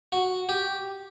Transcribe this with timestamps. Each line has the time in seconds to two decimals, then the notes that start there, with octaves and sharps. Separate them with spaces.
0.12 F#4
0.49 G4